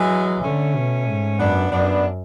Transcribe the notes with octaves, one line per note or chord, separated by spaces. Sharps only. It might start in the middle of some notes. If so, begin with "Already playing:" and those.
Already playing: E3 F#3 G#3
D3 A3 C#4
B2
G#2
F#2 B3 D4
F#2 B3 D4